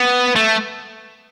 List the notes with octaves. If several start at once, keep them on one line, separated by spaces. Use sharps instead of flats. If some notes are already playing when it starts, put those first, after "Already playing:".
Already playing: B3
A3